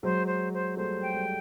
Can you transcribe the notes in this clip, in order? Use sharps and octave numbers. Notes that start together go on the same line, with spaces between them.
F#3 G#3 C5
C5
C5
G3 A3 C5
G5
G3 A3